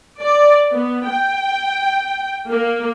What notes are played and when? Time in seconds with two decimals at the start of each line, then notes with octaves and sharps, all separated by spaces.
0.21 D5
0.75 B3
1.09 G5
2.49 A#3